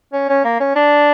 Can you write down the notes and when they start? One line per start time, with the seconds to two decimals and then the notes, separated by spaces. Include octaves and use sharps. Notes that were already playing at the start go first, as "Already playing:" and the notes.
0.13 C#4
0.29 C#4
0.44 A#3
0.60 C#4
0.76 D4